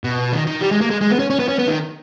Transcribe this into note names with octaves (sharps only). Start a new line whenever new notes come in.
B2
D#3
D#3
G3
G#3
A#3
G#3
G#3
B3
C#4
C#4
B3
C#4
B3
D#3